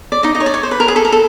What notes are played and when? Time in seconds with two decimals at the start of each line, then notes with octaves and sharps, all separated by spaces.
0.12 D5
0.23 D#4 D#5
0.35 D#4 D#5
0.40 C#5
0.46 D5
0.54 C#5
0.63 C5
0.71 B4
0.80 A#4
0.88 G#4
0.96 A4
1.05 A#4
1.12 A4